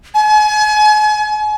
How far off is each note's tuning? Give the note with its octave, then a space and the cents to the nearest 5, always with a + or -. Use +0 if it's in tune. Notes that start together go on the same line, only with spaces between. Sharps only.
G#5 +35